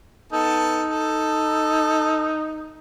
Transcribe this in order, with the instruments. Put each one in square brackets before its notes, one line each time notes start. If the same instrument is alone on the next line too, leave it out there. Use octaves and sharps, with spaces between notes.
[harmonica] B3 A4 A5 [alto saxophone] D#4
[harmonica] A4